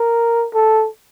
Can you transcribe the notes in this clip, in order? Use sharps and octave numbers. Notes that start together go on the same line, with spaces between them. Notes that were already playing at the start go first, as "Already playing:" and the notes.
Already playing: A#4
A4